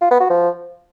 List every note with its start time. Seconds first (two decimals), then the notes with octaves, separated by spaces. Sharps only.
0.01 F4
0.11 B3
0.20 F#4
0.30 F3